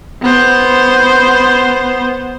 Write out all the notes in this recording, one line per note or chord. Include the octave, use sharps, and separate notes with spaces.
B3 C5